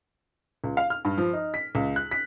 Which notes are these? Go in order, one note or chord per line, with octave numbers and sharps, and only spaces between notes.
C#2
F5
F6
G2
F3
D#4
B6
C#2
F#6
B6